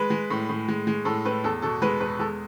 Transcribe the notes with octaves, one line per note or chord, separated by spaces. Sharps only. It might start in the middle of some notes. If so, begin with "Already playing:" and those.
Already playing: G#3 B4
G#3
A2
A2
G#3
G#3
A2 A4
A2 B4
E2 A4
B2 A4
G#3 B4
E2 B4
G#3 A4